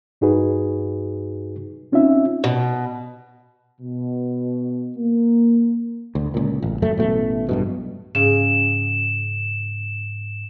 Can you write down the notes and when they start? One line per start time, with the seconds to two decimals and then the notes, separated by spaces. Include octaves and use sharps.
0.21 G2 D#4 F#4 G#4 B4
1.92 C4 C#4 D#4 F4 E5
2.44 B2
3.81 B2
4.97 A#3
6.15 D2
6.34 C#2 A#2
6.62 A1
6.82 F#1 F#2 A3
6.97 A1 B2 A3
7.49 B1 G2 B2
8.15 G#2 C#3 E7